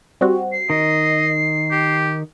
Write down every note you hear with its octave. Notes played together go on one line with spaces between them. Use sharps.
G3 C4 F#4
C7
D#3 D#5
G4